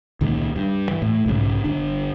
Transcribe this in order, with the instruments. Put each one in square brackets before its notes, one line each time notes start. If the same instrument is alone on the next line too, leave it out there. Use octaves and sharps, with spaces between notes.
[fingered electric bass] C#2 A#2 D#3 G#3
G2
E3
A2
B1 G#2 C#3 G#3
G1 D4